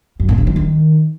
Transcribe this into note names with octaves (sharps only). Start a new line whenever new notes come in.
F#2
A#2
C#3
E3
D#3